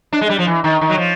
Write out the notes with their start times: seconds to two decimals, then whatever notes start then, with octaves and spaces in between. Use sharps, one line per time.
0.13 D4
0.21 G#3
0.29 G3
0.39 F3
0.47 E3
0.64 D#3
0.81 D#3
0.89 F#3
0.97 F3